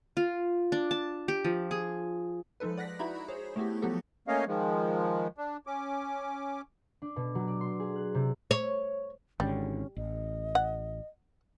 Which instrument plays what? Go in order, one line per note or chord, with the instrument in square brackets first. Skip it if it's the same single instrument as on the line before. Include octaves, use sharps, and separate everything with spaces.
[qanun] F4
D4
A5
G4
F3
G#4
[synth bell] F3 G#3 D#4 A4 B4
D5 F#5 F#6 A#6 B6
D#4 E4 F#4 E5 A#5 B5
G#4 C5 C#5
A3 B3 E4 F#4 G4
F3 F#3 B3 F#4 G4 A4
[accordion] A3 A#3 C#4 C#5 D#5 F5
D#3 F3 G#3
D4
C#4 D6
[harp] D4
B2
F#3
D5
C6
G#4
F#6
C3
[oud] C#5
[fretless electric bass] G#1 G#2 D3 [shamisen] G3 [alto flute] C#4
[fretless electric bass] A1 [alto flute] D#5
[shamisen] F#5